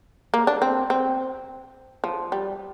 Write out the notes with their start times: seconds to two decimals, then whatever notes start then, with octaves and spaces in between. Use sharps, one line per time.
0.34 A#3
0.47 D4
0.62 C4
0.90 C4
2.04 F3
2.32 G3